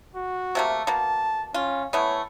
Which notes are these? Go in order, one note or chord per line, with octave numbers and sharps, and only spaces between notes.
F#4
C3 A3 A#3
B2 A#3 A5
C#4 F4
E3 A3 B3 C#5